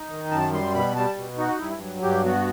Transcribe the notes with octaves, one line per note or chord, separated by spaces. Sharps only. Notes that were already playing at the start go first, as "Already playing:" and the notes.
Already playing: D#4
D#3
F#2 A5
G3 C6
B2 B5
G3 A5
B2
D#4 F#4
G2 E4
F#3
G2 G4
B3 F#4